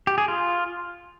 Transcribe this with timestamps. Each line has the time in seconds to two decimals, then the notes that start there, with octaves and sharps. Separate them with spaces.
0.07 G4
0.18 G#4
0.28 F4